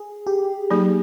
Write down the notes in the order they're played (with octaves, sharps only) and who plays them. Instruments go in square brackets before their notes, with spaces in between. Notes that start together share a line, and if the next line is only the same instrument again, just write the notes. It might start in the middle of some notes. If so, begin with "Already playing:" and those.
Already playing: [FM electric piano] G#4
G4
[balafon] F#3 A#3 D#4 [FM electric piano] G#4